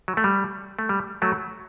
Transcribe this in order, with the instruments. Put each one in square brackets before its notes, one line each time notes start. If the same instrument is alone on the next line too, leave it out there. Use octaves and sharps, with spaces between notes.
[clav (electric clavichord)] F#3
A3
G3
A3
G3
F#3 A3